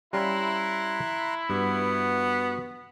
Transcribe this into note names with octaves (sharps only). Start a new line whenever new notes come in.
G3 C#4 E4 F5 A#5 C6 F#6
G2 B3 F#4